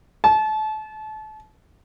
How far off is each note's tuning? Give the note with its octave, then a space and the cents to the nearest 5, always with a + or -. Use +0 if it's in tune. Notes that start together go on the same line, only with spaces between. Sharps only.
A5 -30